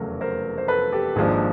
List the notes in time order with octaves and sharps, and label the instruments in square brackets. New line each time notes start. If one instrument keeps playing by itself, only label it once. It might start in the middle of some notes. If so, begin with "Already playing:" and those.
Already playing: [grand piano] F1 E2 C#3 F#3 A3 A4 A#4
A#4 C5
C5
A4 B4
G4 A4
G#1 G#2 F3 A#3 D4 G#4